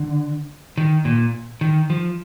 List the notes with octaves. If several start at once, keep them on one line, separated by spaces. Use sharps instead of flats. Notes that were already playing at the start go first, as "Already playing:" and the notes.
Already playing: D3
D#3
A#2
D#3
F3